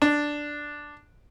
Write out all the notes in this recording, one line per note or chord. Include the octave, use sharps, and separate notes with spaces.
D4